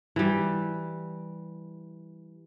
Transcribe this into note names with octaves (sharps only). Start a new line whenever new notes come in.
E3 G3